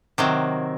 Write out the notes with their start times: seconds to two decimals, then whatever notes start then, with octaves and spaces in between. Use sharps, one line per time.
0.18 C3 D#3 F#3